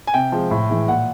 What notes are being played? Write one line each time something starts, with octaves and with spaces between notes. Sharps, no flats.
G#5
C3 G5
F3 G#3
A2
E3 G#3
A#2 F#5